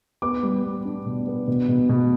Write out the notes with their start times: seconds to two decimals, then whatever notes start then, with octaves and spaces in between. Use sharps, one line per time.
0.22 B3 D6
0.43 G3
0.64 B3
0.85 D4
1.06 B2
1.27 B3
1.48 B2
1.68 B2
1.89 B2